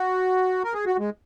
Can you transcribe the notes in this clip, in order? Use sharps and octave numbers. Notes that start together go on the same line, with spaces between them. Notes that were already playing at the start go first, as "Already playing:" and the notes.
Already playing: F#4
A#4
G#4
F#4
G#3